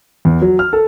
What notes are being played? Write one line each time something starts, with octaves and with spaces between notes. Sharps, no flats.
E2
F#3
F6
A4